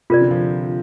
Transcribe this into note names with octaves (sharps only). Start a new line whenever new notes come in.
C3 F4 A#4 D5
D3
F3